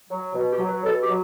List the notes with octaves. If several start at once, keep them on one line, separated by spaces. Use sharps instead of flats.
F#3
B2
G4
F#3
B4
B2 A4
G4
F#3